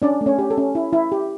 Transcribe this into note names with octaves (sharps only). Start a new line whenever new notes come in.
C#4 D4 D5
A3
C#4 C#5
G4
A4
C#4
E4
E4
G4